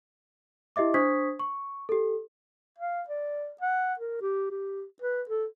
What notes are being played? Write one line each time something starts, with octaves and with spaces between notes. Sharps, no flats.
E4 G4 D#5 E5 D6
D4 C5 C#6 D#6 G#6 B6
C#6
G4 A4
F5
D5
F#5
A#4
G4
G4
B4
A4